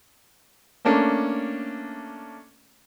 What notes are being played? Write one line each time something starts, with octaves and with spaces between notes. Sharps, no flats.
A3 A#3 C#4 D4